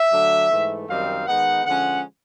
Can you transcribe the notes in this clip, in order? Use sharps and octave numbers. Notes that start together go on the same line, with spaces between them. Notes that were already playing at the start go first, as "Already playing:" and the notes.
Already playing: E5
D3 F#3 A3 D4
G#2 E3 A3
F#2 D#3 G3 C4 D#4 F5
D#3 G#3 B3 D#4 F#5
D3 F3 G#3 C#4 F#5